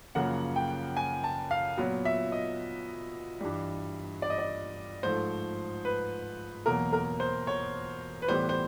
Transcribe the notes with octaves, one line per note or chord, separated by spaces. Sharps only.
F#2 C#3 F3 A#3 F#5
G5
G#5
A5
F5
A#2 F#3 B3
E5
D#5
G2 E3 G3
D5
D#5
D5
G#2 F3 A3 C5
B4
E2 B2 F#3 A#3 A#4
A#4
C5
C#5
B4
A2 E3 G3 B3 C5
C5